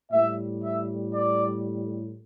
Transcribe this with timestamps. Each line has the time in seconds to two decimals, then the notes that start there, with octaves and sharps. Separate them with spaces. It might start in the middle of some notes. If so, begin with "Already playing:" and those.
0.11 A2 G3 E5
0.63 E5
1.14 D5